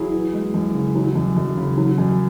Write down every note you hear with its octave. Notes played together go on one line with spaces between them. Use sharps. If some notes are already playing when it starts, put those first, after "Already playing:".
Already playing: F#3 E4 G#4
E3
G#3
F#2
C#3
F#3
F#2
F#2
C#3
F#3
F#2